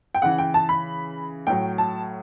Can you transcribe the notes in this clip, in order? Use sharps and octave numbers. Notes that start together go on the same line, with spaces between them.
G5
C#3 E3 F#5
G5
A5
B5
A2 F#3 G5
A5